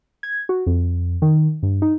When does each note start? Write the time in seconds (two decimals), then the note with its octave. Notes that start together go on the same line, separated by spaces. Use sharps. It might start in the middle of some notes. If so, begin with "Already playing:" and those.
0.23 G#6
0.49 F#4
0.67 F2
1.22 D#3
1.63 G2
1.82 D#4